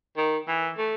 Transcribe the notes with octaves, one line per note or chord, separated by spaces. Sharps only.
D#3
E3
A3